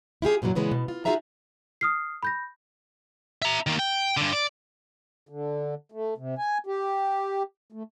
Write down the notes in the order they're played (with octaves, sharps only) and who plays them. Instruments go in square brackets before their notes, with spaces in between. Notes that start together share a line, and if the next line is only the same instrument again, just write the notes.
[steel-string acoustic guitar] E4 F4 G4 G#4
F#2 A#2 E3 F#3
A#2 C#3 E3 G#3 B3
B2
F4
D#4 F4 F#4 G#4 E5 A#5
[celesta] D#6 F6 C7
B5 G6 A#6
[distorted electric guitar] E5 A#5
D#3 A#3
G5
G2 D3
D5
[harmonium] D3
A3
C3
G#5
G4
A3